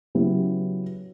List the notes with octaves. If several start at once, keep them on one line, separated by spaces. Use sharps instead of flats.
C#3 F#3 B3 E4 G4